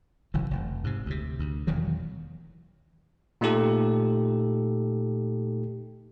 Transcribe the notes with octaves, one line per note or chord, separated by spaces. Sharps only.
G1 C#3 E3 F#3
F1
G#2 C3
D2 C3
D2
E1 E2 D#3 F#3
A#2 A3 D#4 G4 A4